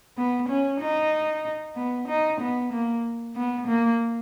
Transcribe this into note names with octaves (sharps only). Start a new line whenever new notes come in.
B3
C#4
D#4
B3
D#4
B3
A#3
B3
A#3